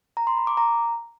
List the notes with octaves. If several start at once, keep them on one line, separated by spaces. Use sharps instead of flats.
A#5
C6
B5
D6
A#5